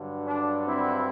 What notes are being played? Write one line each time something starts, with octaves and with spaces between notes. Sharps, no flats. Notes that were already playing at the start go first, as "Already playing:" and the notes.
Already playing: G2 D3 F#3
D4
C4 E4